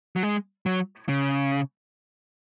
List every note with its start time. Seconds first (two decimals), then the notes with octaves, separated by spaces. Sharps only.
0.16 F#3
0.23 G#3
0.66 F#3
1.09 C#3